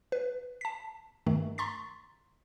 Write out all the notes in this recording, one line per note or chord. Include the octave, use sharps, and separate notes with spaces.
B4
A5 B6
G2 D#3 A3
A#5 C6 C#6 A6 B6